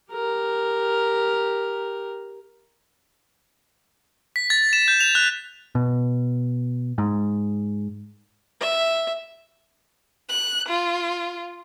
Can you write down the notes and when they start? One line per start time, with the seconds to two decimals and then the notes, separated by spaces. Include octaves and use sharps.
0.12 G4 A#4
4.36 B6
4.50 A6
4.73 E7
4.88 G6
5.01 F7
5.15 F#6
5.75 B2
6.98 G#2
8.61 E5
10.29 F#6
10.69 F4